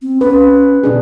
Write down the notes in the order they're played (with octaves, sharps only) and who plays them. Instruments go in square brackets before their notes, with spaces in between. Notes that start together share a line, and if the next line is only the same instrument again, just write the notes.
[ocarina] C4
[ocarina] C#4 [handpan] B4
[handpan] B2 D4 G#4